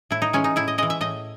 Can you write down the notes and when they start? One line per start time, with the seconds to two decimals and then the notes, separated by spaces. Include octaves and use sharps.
0.11 A2 E4
0.22 D#4
0.33 E3 G#3 C#4
0.44 D#4
0.56 A2 E4
0.68 D#5
0.78 E3 G#3 D#5
0.90 E5
1.01 A2 D#5